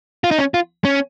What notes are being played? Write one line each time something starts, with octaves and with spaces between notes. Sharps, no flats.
F4
D#4
C#4
F4
C#4